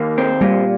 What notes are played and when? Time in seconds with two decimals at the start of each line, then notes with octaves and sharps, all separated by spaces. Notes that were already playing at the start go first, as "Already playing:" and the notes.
Already playing: D#2 A#3
0.18 C4
0.41 A#2 G3